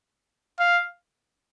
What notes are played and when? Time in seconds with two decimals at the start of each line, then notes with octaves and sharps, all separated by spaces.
0.59 F5